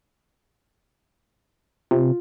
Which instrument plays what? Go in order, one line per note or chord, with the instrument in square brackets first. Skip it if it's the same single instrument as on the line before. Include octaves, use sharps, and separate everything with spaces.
[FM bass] C3 [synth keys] F4